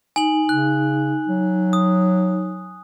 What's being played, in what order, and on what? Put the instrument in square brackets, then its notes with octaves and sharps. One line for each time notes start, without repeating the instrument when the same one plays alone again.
[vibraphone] D#4 [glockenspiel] G#5 F#7
[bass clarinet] C#3 [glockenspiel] F#6
[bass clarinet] F#3
[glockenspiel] D#6